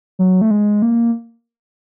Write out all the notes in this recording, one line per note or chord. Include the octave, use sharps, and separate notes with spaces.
F#3
A3
G#3
A#3